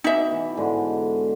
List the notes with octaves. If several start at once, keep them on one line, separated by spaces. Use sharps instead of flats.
B2 D#4 E5 G#5 D6
B2 E3
G#2 D3 G#3